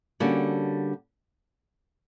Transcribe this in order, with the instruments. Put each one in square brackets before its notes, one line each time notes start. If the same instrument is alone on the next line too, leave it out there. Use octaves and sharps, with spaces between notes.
[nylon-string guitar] D3 G3 A#3 C#4 F#4